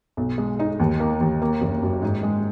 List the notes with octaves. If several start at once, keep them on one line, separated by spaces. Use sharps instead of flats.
B1
G#3
D#4
D#2
A#3
D#2
A#3
F#1
F#2
G#2
G#3